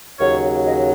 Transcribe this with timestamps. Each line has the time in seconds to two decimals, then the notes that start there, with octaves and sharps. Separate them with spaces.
0.19 D#2 C#3 F#3 C#5
0.65 D#5